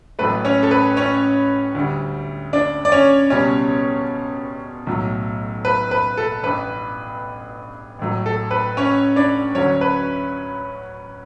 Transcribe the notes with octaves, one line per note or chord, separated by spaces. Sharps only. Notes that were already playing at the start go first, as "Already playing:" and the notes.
A1 A2 F#3 A3 B4
C#4 C#5
A4
B4
C#4 C#5
D2 D3 G3
D4 D5
D5
C#4 C#5
C#2 B2 G3 C#4 C#5
B1 A2 F#3 A3
B4
B4
A4
A1 G2 E3 B4
A1 A2 F#3
A4
B4
C#4 C#5
D4 D5
D2 D3 F#3 C#4 C#5
B4